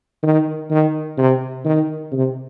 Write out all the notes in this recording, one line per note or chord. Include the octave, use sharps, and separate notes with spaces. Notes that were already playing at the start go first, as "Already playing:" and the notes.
D#3
D#3
C3
D#3
C3